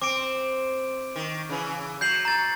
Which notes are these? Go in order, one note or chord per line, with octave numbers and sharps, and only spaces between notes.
C4 D6 D7
D#3
C#3 E3
F#3 G6 C7 F#7
A#5 G6 A6